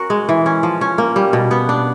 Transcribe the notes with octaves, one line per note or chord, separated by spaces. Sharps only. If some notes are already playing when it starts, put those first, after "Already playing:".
Already playing: C#4 F#4 A#4
G#3
E3
C#4
F3
C#4
A#3
G3
B2
B3
D4